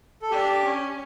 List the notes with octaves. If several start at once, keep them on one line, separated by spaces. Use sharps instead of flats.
A4
D4 G4
C#4